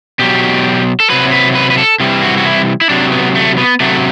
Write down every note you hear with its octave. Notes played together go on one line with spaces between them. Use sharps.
B2 F#3 G4
A4
C3 F#3 B4
B4
B4
B4
A4
C3 E3 G3
F#4
F#4
E4
E4
C3 F#3 D4
B3
A3
B3
C3 F#3 A3